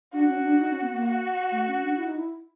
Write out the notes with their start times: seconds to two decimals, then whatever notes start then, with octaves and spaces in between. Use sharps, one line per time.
0.13 D4 F#4
0.29 C#4
0.43 D4
0.59 D#4
0.71 C#4
0.82 B3
0.93 A#3
1.05 F#4
1.52 A3
1.67 C#4
1.83 D4
1.97 E4
2.06 D#4
2.16 E4